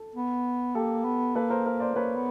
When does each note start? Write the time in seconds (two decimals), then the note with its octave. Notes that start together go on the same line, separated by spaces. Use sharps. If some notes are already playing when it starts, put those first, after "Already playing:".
Already playing: A4
0.15 B3
0.75 A#3 G4 A4
1.05 B3
1.35 A#3 A4 B4
1.50 A#4 C5
1.65 A#4 C5
1.80 C5 D5
1.95 A#3 B4 C#5
2.16 B3